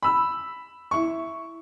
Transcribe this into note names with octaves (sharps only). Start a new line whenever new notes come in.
B5 E6
E4 C#6